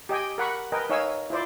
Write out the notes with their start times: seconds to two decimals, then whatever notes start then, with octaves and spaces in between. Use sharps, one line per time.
0.09 G4 D#5 G5 G#5
0.38 A#4 F#5 B5 C#6
0.72 A#4 B4 D#5 G5 G#5
0.90 D#4 C#5 F5 G#5 E6
1.30 E4 F4 C5 D5